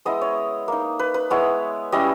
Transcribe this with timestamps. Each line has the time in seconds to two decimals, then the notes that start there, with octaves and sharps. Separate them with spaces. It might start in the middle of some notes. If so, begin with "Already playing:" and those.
0.05 G#3 B3 E4 D#5
0.21 C#5
0.68 A#3 D#4
0.99 B4
1.14 B4
1.30 G#3 B3 E4 C#5
1.92 G3 C#4 E4 D#5